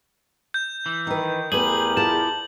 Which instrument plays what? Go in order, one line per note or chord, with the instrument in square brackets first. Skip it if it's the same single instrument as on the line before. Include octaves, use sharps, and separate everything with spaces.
[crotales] G6
[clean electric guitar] E3
[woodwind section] D#3 [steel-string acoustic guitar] D#4 B4
[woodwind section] E2 G4 A#4 [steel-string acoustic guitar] A3 B3 B4 [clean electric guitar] G#4 [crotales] F#7
[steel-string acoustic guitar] E4 F4 G#4 [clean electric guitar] A5